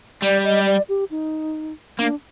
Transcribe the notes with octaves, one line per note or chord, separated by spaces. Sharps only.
G3 D5
D#5
D5
G4
D#4
A#3 D4